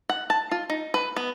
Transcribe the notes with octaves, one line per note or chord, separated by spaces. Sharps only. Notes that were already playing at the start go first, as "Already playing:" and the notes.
F#5
A5
F4
D#4
B4
B3